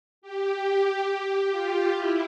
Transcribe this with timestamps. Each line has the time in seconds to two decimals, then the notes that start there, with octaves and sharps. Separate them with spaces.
0.22 G4
0.65 G4
1.07 G4
1.51 F4
1.93 E4